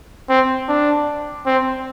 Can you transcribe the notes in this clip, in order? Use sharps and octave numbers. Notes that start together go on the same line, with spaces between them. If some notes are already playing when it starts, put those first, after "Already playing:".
C4
D4
C4